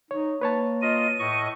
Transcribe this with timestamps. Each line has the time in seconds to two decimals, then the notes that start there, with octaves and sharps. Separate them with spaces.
0.11 D#4 C#5
0.41 A#3 B4 C#5 A5
0.82 F4 D#5 D#7
1.19 A2 D#5 C#6